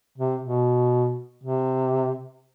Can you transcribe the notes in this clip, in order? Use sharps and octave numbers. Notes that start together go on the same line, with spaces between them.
C3
B2
C3